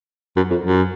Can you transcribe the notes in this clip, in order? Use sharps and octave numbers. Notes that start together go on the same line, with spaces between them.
F#2
F2
F#2